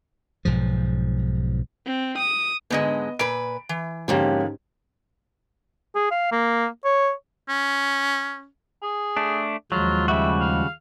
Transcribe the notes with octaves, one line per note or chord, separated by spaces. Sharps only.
B1 G#2 F3
C4
D#6
G#2 D3 G#3 B3 D#5
A#2 B4 D7
E3
G#2 D3 F3 A#3 C#4 G4
G#4
F5
A#3
C#5
C#4
G#4
A3 D4
D#2 F3 F#3 G#3 F4
C#3 G3 F#4 E5
F5